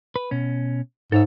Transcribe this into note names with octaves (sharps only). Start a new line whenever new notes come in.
B4
B2 C#4
G#2 A4 C#5 E5